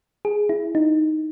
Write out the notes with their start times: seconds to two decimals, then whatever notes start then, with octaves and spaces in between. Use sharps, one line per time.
0.25 G#4
0.49 E4
0.75 D#4